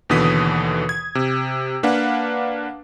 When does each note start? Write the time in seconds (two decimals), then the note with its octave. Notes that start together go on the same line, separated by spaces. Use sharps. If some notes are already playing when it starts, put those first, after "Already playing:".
0.09 D#2 B2 D3 E3 D#6 B6
0.89 G#6
1.15 C3
1.83 A#3 D4 B4 F5 F#5